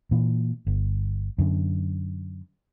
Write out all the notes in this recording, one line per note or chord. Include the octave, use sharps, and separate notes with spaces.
A#2 E3
G1
F#2 D3